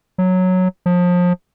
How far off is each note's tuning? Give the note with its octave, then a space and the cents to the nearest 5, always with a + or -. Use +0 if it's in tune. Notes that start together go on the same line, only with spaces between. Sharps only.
F#3 -5
F3 +30